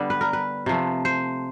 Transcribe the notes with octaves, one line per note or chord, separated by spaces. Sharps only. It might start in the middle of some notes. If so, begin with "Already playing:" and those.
Already playing: D3 G3 B3
B4
A#4
B4
C3 F3 A3
C5